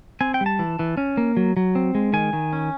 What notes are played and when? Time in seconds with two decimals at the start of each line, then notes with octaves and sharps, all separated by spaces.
0.21 C4 G#5
0.34 G5
0.41 G3
0.46 A5
0.59 E3
0.79 E3
0.97 C#4
1.17 A#3
1.37 F#3
1.57 F#3
1.75 C4
1.95 G#3
2.13 D#3 G#5
2.33 D#3
2.53 C#4